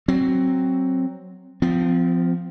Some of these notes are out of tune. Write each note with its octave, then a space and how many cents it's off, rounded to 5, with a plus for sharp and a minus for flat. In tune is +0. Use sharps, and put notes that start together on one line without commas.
F#3 +10 C4 +10
F3 +0 C4 -30